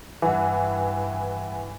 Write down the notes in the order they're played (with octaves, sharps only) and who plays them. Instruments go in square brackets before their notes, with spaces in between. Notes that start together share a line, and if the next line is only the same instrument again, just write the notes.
[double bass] G2 [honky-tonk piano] E3 [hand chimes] E5 F#5